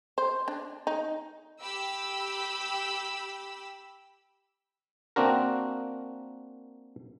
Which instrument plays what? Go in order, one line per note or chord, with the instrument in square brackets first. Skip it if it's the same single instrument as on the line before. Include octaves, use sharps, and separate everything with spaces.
[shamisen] C5
D4
D#4
[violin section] G4 B5 E6
[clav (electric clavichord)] A#3 C4 D4 F#4 A#4